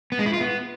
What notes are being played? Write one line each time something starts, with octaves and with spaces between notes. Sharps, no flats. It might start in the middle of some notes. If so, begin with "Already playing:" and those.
B3
G#3
E4
F4
B3